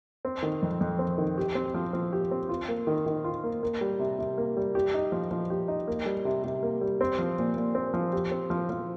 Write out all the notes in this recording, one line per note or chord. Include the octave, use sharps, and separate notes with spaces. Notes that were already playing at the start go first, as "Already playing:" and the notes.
C4
D#3
F2
F2
C4
D#3
G4
C4
F3
F3
G4
C4
F4
A#3
D#3
D#3
F4
A#3
A#3
G3
C3
C3
A#3
G3
G4
D#4
F3
F3
G4
D#4
A#3
G3
C3
C3
A#3
G3
C4
F3
A#2
A#2
C4
F3
G4
C4
F3
F3